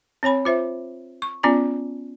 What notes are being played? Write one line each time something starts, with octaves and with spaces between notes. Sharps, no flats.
C4 C#5 G#5 B5
F4 C5 E5
C#6
B3 C#4 F4 D5 G#5 A5